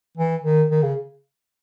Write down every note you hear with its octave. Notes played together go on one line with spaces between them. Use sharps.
E3
D#3
D#3
C#3